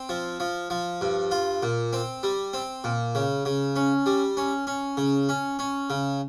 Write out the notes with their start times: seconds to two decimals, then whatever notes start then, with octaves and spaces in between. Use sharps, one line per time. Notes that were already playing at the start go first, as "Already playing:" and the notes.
Already playing: C4
0.09 F3
0.40 F3
0.70 F3
1.01 G2
1.31 F4
1.63 A#2
1.93 C4
2.23 G3
2.53 C4
2.84 A#2
3.15 C#3
3.45 C#3
3.76 C#4
4.06 G3
4.37 C#4
4.67 C#4
4.97 C#3
5.29 C#4
5.59 C#4
5.90 C#3